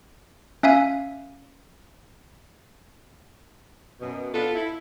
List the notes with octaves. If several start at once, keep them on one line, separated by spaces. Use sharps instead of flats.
C#4 E5 F5 G#5
F#2 B2
B3 D4 F4 A4
E4